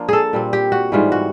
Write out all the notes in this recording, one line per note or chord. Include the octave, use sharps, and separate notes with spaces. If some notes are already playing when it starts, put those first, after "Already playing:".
Already playing: F3 A#3 D4 F4
G#4 A4
A#2 G3 C4
G4
F#4
G#2 E3 G3 F4
F#4